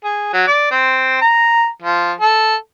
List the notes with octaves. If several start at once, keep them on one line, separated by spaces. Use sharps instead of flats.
G#4
F#3
D5
C4
A#5
F3
A4